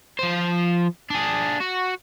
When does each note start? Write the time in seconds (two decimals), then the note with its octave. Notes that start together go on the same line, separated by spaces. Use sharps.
0.19 F3 C5
1.10 D4 G#4
1.61 F#4